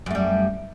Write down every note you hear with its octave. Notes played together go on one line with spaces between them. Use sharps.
F#2 G3 A3